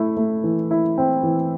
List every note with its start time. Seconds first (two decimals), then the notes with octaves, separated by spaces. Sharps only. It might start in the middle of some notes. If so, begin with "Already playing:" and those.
Already playing: A3 E4
0.17 A3
0.44 E3
0.71 E4
0.98 C4
1.23 E3